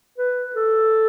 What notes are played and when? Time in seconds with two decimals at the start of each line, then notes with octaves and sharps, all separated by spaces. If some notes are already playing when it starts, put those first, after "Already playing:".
0.18 B4
0.56 A4